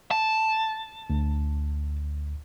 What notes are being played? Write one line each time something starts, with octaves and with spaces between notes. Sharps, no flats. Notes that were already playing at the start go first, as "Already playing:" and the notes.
A5
D2